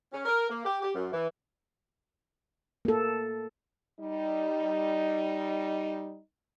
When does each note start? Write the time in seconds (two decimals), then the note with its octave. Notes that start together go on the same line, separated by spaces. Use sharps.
0.12 C#4
0.25 A#4
0.49 A#3
0.64 G4
0.81 G4
0.94 F#2
1.12 E3
2.85 A#3 A4
3.99 G3 D#4